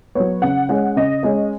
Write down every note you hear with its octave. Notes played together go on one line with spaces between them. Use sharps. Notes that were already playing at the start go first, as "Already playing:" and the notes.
F#3 B3 C#5
C#3 F#5
G#3 C#4 F#5
C#3 D#5
G#3 C#4 D#5